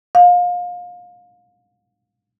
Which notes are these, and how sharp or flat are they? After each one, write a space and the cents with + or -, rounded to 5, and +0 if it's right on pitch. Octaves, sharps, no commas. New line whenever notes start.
F5 +30